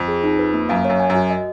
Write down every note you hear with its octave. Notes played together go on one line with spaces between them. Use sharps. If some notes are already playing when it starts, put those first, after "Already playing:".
Already playing: F2
G#4
D#4
B4
A#3
F#2 F5
F#2 C#5
G#5
F#2
F#4
D#5